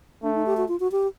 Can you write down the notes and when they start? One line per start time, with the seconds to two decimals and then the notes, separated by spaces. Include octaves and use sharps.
0.23 A3 D4
0.35 D#4
0.46 G4
0.57 F#4
0.68 F4
0.80 F#4
0.92 G4